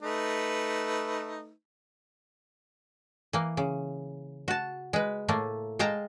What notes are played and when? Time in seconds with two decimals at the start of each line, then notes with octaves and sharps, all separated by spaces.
0.02 A3 D#4 B4
3.33 E3 A#3
3.57 C#3
4.48 F#4 A5
4.93 G#3 B4
5.28 A2 A3 A#3
5.79 G#3 F5 G5 A5 A#5